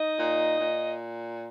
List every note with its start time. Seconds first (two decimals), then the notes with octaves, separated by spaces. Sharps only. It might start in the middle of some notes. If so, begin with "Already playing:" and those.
Already playing: D#4 D#5
0.18 A#2
0.59 A#2